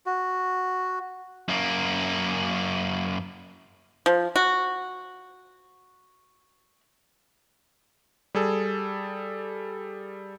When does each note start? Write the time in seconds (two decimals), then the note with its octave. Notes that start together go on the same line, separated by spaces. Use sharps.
0.06 F#4
1.48 F#2 A#3
4.06 F3
4.36 F#4
8.35 G3 G#4 A4